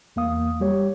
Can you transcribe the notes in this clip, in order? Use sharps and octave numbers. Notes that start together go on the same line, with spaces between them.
E2 A#3 F5 D#6
G3 G4 C#5